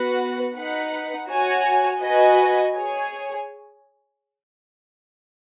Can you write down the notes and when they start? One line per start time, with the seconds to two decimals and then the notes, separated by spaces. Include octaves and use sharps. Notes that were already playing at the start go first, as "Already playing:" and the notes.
Already playing: B3 F#4 B4 F#5
0.56 D#4 B4 F#5
1.29 F#4 C#5 G#5
2.01 F#4 B4 D#5 G#5
2.75 G#4 C#5 G#5